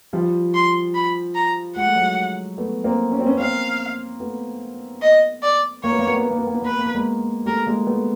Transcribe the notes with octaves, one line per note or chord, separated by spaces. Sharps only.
F3 G3
C6
B5
A#5
G#3 F#5
A3
F#3 G#3
A3 B3
A#3 C4
C#4
C4
B3 C#4
A#3 C4 F5
A3 B3
D#5
D5
A#3 C#5
B3
A#3
B3
A#3
B3
A#3
B3
A#3
B3
A#3 B4
B3
A#3
B3
G#3 A#3
G3 A3 A#4
G#3 A#3
A3 B3